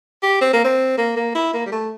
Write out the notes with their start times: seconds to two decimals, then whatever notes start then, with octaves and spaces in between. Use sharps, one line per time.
0.23 G4
0.41 C4
0.53 A#3
0.64 C4
0.98 A#3
1.16 A#3
1.35 E4
1.54 A#3
1.66 G3
1.72 A3